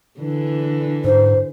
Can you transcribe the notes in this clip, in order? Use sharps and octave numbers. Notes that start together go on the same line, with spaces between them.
D3 E3
G#2 C5